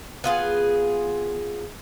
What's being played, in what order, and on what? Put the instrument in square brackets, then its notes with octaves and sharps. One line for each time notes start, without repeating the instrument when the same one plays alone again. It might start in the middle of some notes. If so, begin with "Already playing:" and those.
[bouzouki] B3 F4 G#4